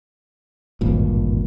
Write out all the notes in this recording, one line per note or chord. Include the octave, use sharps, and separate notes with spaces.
D1 G#1 G2 A#2